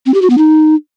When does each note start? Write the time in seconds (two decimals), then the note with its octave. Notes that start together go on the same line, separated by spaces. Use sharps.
0.06 C4
0.14 G4
0.22 F#4
0.30 B3
0.38 D#4